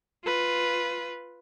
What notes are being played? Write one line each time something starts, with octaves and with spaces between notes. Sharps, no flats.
F4 B4